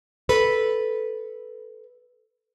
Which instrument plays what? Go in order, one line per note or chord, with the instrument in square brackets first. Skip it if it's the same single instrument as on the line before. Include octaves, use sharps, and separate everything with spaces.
[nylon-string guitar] A4 B4